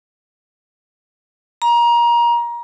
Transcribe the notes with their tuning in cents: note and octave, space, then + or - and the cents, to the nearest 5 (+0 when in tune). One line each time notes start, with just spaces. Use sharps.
A#5 +25